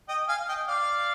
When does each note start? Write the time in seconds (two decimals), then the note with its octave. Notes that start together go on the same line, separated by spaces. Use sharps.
0.09 D#5 G5
0.29 F5 G#5
0.49 D#5 G5
0.68 D5 F5